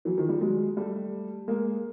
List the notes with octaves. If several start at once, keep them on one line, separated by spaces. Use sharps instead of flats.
E3 F#3
D#3 F3
F3 G3
F#3 G#3
G3 A3
G#3 A#3